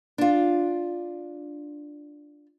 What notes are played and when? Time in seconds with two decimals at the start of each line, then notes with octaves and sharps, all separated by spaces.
0.18 D4 F4